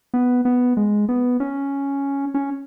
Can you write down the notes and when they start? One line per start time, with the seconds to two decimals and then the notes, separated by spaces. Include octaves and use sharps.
0.14 B3
0.45 B3
0.77 G#3
1.09 B3
1.40 C#4
2.34 C#4